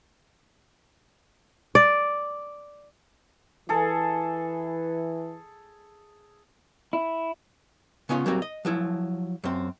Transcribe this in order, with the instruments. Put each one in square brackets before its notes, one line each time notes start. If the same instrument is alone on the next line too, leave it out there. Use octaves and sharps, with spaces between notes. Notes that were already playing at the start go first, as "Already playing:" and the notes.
[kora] D5
[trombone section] E3 [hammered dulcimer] G#4 A4
[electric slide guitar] E4
[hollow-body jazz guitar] C#3 B3 C#4 F4 C#5
F#3 G3 A#3 C4 F#4
D#5
F3 F#3 E4
F#2 C4